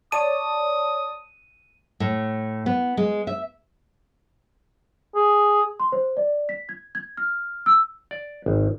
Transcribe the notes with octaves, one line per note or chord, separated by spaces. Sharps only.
C#5 D5 A5 D#6 D#7
A2
B3
G#3
E5
G#4
C6
C5
D5
B6
G#6
G#6
F6
E6
D5
G#1